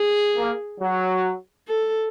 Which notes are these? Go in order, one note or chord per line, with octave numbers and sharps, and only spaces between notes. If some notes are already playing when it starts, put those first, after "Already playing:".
Already playing: G#4
A#3
F#3
A4